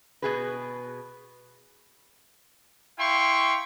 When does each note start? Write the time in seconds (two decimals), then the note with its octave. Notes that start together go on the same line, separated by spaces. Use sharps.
0.22 B2 G#4 B4
2.99 E4 F5 G5 C6 C#6